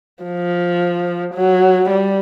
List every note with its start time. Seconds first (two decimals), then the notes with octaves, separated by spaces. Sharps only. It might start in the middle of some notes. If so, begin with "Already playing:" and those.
0.24 F3
1.34 F#3
1.90 G3